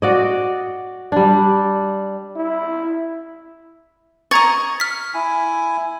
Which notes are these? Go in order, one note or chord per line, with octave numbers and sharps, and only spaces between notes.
F#4 D5 D#5
G3 D4
E4
D#5 A#5 C#6 G#6 A6
F6 B6
E4 G#5